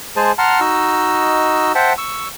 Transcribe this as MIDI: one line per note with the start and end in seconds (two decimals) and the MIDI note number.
0.16 0.32 56
0.16 0.32 68
0.16 0.32 72
0.16 0.32 80
0.16 0.32 81
0.38 0.60 78
0.38 0.60 81
0.38 0.60 82
0.38 0.60 84
0.38 0.60 89
0.61 1.72 63
0.61 1.72 66
0.61 1.72 75
0.61 1.72 88
1.75 1.93 72
1.75 1.93 76
1.75 1.93 78
1.75 1.93 79
1.75 1.93 81
1.98 2.28 85
1.98 2.28 88